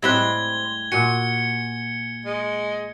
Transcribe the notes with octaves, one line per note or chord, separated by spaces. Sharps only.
A2 G3 G#3 C4 B5 F#6 G#6 G7
A#2 F#4 G#5 C#7
G#3